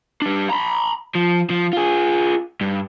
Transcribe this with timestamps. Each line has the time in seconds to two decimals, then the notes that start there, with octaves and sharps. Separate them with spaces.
0.22 G3 D4
0.50 A#5 B5
1.15 F3
1.50 F3
1.73 F4 G#4
2.61 G2